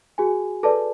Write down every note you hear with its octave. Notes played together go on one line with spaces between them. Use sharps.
F#4 G#4 G#5
A4 B4 D5 A5